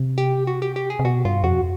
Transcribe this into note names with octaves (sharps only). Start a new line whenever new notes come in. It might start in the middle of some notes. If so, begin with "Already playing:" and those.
Already playing: C3
G4
F#4
G4
G4
G#4
C3
B2 F#4
G2 F4
F2 F#4